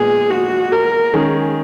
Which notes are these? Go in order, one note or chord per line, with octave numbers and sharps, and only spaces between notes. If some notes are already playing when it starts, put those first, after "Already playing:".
Already playing: A#2 G#3 B3 G#4
F#4
A#4
D#3 G#3 C#4 G#4